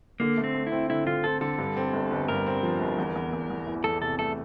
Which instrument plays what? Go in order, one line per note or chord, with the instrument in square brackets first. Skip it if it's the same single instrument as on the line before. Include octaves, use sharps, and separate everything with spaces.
[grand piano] D3 [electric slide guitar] A#3
[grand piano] A3
[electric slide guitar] C4
[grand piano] A3
[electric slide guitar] E4
[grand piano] C4
[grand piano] D3 [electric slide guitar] E4
[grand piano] D3 [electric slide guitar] F4
[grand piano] C4 [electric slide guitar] A4
[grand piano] D3 [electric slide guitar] A4
[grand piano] G2
C4
G1
G1
[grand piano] G2 [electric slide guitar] A#4
[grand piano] C4
F3
G1
E2
E2
E2
E2
E3
[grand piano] E2 [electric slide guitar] A4
[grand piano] C3 [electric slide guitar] A4
[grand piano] A3 [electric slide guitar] A4